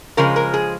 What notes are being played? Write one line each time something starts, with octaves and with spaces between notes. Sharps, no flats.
C#3 F3 G#3 A#4
A#4
G#4